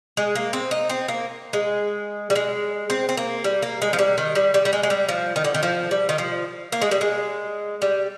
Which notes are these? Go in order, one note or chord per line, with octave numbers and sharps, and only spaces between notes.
G#3
A#3
C4
D#4
C4
A#3
G#3
G3
G#3
C4
C4
A#3
G3
A#3
G#3
F3
G3
D#3
G3
G3
G3
G#3
G#3
G3
F3
D#3
D3
D#3
F3
G3
D#3
F3
A#3
G#3
G3
G#3
G3